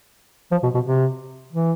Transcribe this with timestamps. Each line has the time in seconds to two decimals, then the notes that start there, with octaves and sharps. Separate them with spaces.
0.51 F3
0.63 B2
0.74 B2
0.85 C3
1.52 E3